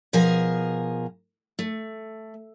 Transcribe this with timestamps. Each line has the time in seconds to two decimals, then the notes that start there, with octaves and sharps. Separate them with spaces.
0.13 B2 F3 G#4 A#4 G#5
1.59 A3